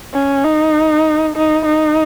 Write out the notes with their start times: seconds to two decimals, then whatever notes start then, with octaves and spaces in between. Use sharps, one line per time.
0.14 C#4
0.44 D#4
1.36 D#4
1.65 D#4